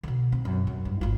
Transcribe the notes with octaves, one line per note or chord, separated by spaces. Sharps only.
B2 D3
C4
F#2
F#2
G2
G#1 F4